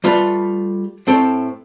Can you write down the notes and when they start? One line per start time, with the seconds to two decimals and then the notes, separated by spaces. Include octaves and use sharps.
0.04 G3 A3 F4 A4 B4
1.07 A2 C4 A4 C#5 G5